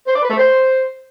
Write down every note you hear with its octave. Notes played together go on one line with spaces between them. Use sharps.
C5
D5
B4
A3
C5